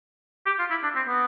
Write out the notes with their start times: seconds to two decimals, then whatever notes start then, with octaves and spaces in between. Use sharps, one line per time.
0.46 G4
0.59 F4
0.70 E4
0.83 D4
0.96 C4
1.08 B3